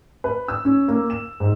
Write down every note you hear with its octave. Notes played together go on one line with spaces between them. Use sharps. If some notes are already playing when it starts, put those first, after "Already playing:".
B4
E6
C#4
A#3
E7
G#2